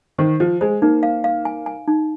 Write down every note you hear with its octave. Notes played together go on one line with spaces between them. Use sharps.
D#3 C5
F3 C5
G#3 C5
A#3 D#4
F5
F5
G#5
G#5
D#4